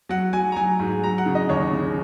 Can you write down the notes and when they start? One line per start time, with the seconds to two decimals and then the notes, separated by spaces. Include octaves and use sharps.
0.09 F#3 F#5
0.33 F#3 G#5
0.52 A#5
0.56 F#3 G#5
0.79 G#2
1.03 F#3 A#5
1.18 F#5
1.26 C#3
1.35 D#5
1.49 D#2 C#5
1.73 C#3